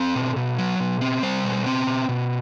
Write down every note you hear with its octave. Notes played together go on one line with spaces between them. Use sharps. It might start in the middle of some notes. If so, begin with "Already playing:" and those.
Already playing: C4 A4
B2
B2
F#3
B2
C4
G3 C5
B2
C4
B2
B2